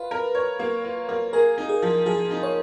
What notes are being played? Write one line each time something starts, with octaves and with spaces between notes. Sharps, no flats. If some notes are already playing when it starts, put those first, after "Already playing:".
Already playing: F4 B4
A#4
C#5
A#3
F4
A#3
G#4 A#4
D#4
G#4
F3
F3 G#4
D#4
C#5